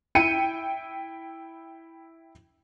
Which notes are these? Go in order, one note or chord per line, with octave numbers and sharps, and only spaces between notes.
E4 G5 C#7 D#7